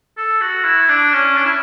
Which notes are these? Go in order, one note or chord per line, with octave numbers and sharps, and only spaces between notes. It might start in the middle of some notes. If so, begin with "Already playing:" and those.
A4
F#4
E4
D4
C#4
D4
E4